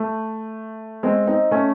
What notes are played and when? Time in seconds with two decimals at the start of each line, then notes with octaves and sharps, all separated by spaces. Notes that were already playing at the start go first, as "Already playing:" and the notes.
Already playing: A3
1.03 G#3 C4
1.27 C4 D#4
1.51 A3 C#4